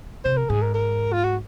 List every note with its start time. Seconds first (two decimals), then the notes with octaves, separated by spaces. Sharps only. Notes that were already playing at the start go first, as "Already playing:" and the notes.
0.24 C3 C5
0.37 A#4
0.49 G#2 G#4
0.62 A#4
0.74 A#4
1.13 F4
1.24 F#4